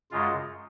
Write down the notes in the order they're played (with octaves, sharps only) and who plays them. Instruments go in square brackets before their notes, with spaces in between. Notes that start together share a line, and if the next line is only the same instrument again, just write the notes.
[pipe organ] F#2 C#3 G#3 F4